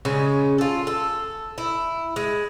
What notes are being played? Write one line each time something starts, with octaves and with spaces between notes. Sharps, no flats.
C#3 G#3 C#4
F4 A4
A4
E4
G#3